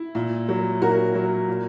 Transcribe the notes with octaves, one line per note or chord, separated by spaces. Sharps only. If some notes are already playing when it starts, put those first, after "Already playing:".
Already playing: E4
A#2
F#3
A#2 F#4 A#4
F#3
A#2